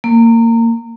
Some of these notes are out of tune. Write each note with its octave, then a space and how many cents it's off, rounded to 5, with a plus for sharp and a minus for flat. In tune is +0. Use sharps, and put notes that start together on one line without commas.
A#3 -25